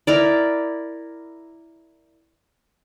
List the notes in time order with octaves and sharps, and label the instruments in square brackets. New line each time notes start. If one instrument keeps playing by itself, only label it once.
[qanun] E4 A#4 D5